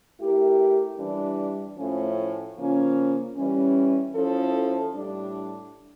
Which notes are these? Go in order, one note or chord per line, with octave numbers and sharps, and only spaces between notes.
A3 E4 G4 A#4
E3 G3 D4
A2 F3 A3 C#4
C#3 F3 A#3 C#4 F4
E3 G3 C#4
F3 C#4 E4 A4
A2 G3 D4